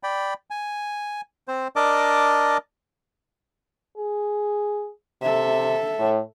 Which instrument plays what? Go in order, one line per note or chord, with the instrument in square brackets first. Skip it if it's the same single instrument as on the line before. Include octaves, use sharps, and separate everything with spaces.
[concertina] D5 G5 B5
G#5
C4 C5
D4 A#4 D5 D#5 A5 D6
[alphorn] G#4
[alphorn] C3 [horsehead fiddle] A4 E5
[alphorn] A2